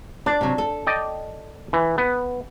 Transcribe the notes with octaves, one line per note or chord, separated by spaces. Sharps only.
D4 D5
C3 F#3
A4
D5 D#5 G5
E3
B3